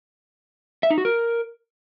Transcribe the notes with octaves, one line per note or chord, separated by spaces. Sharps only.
E5
D#4
F#4
A#4